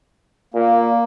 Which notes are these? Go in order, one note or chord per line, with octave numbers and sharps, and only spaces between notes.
A#2 A#3